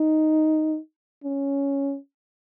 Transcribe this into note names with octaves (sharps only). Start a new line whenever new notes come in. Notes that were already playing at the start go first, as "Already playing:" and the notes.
Already playing: D#4
C#4